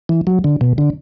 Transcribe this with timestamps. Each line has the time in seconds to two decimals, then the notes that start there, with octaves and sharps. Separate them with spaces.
0.09 E3
0.27 F#3
0.44 D3
0.61 B2
0.78 D3